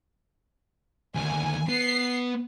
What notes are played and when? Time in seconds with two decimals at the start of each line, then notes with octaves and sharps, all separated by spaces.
1.15 D2 D#3 G#5
1.69 B3 C7